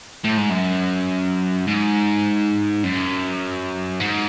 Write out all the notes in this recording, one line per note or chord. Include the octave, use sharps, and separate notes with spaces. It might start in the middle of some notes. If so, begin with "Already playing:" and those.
A2
G#2
F#2
G#2
F#2
G#2